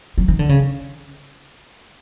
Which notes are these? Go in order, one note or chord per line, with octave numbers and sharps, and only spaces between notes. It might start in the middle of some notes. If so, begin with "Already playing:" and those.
F#3
D#3
D3
C#3